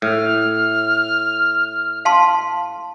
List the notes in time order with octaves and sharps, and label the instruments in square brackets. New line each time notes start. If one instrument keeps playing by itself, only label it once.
[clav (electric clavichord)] A2 [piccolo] F6
[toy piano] F5 A5 C6